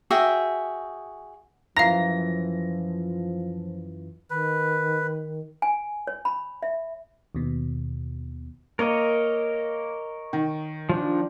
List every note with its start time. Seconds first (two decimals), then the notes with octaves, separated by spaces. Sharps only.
0.11 F#4 G#4 E5 G5
1.77 F#2 E3 F3 F4 F5 A#5 A#6
4.30 D#3 B4
5.62 G#5
6.07 C#5
6.25 B5
6.63 E5
7.35 D#2 B2
8.79 A#3 A#4 C#5 D#5
10.33 D#3
10.89 F3 D4